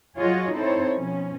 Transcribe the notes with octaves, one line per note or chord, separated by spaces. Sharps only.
F#3 F4 F#4 G#4 C#5 D#5
C4 D#4 E4 A4 C5 C#5
B2 F3 C#4